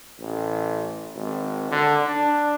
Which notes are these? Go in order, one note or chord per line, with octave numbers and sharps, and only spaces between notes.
A1
G#1
D3
D4